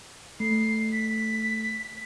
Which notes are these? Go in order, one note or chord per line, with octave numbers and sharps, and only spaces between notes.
A3 C7
B6